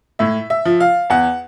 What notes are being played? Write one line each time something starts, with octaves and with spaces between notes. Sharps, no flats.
A2 E5
E5
F3
F5
E2 F#5